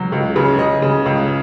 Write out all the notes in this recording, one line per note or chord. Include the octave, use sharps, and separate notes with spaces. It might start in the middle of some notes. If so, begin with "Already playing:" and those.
Already playing: C#2 F#3
C#2
C#3
C#3 D#5
C#3
C#2